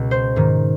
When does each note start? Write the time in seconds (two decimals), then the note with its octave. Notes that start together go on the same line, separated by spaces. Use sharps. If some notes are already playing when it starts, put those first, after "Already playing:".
Already playing: C#2 B2
0.11 C5
0.36 G#2 D#3